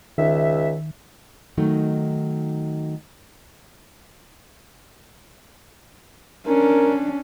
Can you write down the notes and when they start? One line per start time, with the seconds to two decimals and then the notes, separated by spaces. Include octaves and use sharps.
0.18 C#2 D#3 E5
1.58 D#3 F#3 A3 D#4
6.47 C#4 D4 A#4